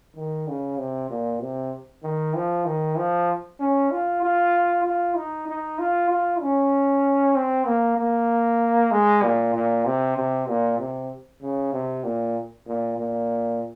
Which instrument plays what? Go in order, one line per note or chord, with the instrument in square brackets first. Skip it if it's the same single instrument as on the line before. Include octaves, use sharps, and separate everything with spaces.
[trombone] D#3
C#3
C3
A#2
C3
D#3
F3
D#3
F3
C#4
F4
F4
F4
D#4
D#4
F4
F4
C#4
C4
A#3
A#3
G#3
A#2
A#2
C3
C3
A#2
C3
C#3
C3
A#2
A#2
A#2